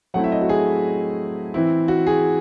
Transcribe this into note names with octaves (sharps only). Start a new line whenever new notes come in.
F#3 A3 C4 E4 F#5
E5
D#5
F#4
G#4
E3 C4 E4
F#4
G#4